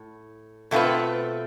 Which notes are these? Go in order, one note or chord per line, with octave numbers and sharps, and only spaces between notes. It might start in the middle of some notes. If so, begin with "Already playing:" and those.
Already playing: A2
B2 A3 C4 F4 B4